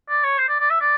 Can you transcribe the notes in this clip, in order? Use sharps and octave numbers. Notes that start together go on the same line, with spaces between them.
D5
C#5
C5
D5
D5
E5
D5